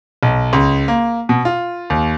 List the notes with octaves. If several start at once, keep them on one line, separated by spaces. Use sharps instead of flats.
B1
C#2
A#3
B2
F4
D#2